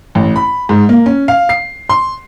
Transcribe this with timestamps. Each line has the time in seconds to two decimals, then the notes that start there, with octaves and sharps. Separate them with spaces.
0.15 A1
0.36 B5
0.69 G#2
0.89 A#3
1.06 C#4
1.28 F5
1.49 C7
1.89 C6